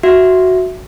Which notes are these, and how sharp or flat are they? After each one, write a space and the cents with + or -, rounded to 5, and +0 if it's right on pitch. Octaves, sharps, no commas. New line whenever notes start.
F#4 +0 E5 +0